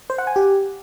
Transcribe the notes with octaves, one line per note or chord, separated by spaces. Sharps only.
C5
F#5
G#5
G4